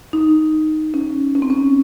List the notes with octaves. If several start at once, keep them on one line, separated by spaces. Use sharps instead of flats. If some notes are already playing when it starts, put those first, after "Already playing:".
D#4
C#4
C#4
C4
C#4